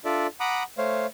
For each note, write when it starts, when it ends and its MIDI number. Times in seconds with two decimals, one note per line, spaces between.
0.05 0.27 62
0.05 0.27 65
0.05 0.27 69
0.05 0.27 74
0.05 0.27 76
0.40 0.63 78
0.40 0.63 82
0.40 0.63 83
0.40 0.63 86
0.40 0.63 87
0.78 1.06 57
0.78 1.06 72
0.78 1.06 73
0.78 1.06 77